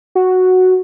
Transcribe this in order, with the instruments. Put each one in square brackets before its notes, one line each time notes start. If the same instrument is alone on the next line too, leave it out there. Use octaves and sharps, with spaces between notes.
[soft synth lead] F#4